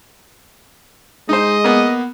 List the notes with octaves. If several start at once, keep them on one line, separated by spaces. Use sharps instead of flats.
G#3 D#4 C5 D#5
A#3 B3